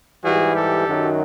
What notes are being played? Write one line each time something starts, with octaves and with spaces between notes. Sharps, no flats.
G#2 E3 G3 F#4 G#4
G4 A4
F#2 D#3 F#3